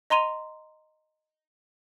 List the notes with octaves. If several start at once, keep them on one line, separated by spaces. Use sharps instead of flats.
D#5 A#5 C6 D#7 F7